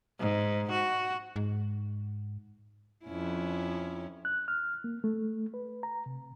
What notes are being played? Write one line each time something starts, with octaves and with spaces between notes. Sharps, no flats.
G#2
F#4
G#2
F2 C#4 E4
F#6
F6
A#3
A3
B4
A#5
C3